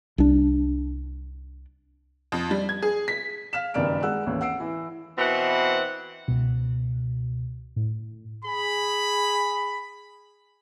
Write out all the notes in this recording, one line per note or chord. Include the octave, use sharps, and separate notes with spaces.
C2 D4
F2
G3
G#6
G#4
B6
F5 F6 B6 E7
F#1 G2 D#3 D5 F6 D7
G#3 F#5 E6 F#6
A1 D#2
F#5 E6 C7 D7
E3
B2 E3 C4 F#5
C#2 B2
A2
G#4 B5